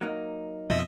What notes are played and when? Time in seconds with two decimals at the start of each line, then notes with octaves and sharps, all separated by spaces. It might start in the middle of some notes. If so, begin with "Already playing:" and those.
0.01 F#3 A#3 D#4
0.70 F2 B2 F3 D#5 E5